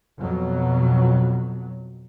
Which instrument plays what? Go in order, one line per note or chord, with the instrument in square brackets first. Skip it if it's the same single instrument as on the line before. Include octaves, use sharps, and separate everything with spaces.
[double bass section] F2 B2 F#3